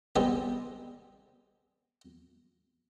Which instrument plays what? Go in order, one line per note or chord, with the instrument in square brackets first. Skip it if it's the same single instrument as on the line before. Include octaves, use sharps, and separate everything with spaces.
[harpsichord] D3 D#3 G3 B3 C4 G#4